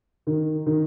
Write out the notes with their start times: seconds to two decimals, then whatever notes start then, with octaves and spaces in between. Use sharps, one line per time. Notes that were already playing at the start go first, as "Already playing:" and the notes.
0.27 D#3
0.66 D#3